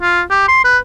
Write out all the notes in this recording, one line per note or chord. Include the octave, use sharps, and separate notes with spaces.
F4
G4
C6
B4